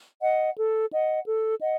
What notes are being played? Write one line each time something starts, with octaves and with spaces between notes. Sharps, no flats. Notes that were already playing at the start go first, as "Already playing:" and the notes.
D#5 F#5
A4
D#5 F#5
A4
D#5 F#5